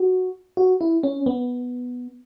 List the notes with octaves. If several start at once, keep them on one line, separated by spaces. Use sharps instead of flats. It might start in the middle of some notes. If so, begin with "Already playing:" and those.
Already playing: F#4
F#4
E4
C#4
B3